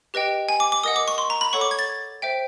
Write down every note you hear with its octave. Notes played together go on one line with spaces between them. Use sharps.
G4 B4 D#5 G5
G#5
D6
D6
A#4 D#5 F#5 D#6
D6
C#6
C6
A#5
B5
A4 C#5 F#5 C#6
D6
G#6
A6
C5 E5 G5